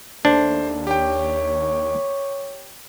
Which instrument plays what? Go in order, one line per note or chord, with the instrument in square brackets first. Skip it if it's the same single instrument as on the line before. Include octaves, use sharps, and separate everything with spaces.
[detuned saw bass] D#2 [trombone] A3 [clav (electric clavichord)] D4 [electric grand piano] C5
[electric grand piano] G4 G5 [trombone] C#5